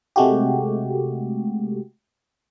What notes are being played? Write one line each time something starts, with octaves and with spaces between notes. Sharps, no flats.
C3 G#3 A3 F#4 G4